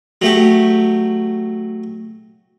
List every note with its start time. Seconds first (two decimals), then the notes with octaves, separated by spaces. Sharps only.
0.22 F#3 A3 G4